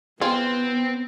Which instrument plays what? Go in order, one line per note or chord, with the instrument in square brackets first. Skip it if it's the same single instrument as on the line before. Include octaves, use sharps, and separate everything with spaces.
[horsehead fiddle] B3 [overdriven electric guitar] C4 [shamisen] F4 G#4